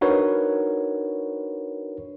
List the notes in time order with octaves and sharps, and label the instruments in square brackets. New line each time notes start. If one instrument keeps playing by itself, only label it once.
[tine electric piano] D4 D#4 F#4 A#4 B4 C#5